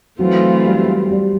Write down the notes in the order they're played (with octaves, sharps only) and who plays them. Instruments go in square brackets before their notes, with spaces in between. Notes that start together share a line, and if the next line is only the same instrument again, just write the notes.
[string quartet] E3 A3 C4 F4 [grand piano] F#3
[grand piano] G3
G3